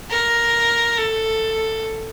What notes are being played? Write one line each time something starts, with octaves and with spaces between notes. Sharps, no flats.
A#4
A4